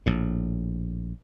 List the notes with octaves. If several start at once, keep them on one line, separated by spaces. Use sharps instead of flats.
A#1 A2